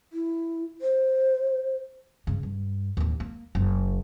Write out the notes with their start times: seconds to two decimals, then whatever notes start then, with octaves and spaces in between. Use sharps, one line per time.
0.13 E4
0.81 C5
2.27 G2 C#3
2.43 G2
2.97 A1 D#2
3.20 A#3
3.55 F#1